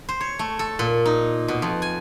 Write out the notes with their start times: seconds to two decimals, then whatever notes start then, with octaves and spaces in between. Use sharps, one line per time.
0.09 C5
0.21 C#5
0.39 A3
0.59 A4
0.79 A#2
1.06 D#4
1.48 B2
1.62 F2
1.82 G#5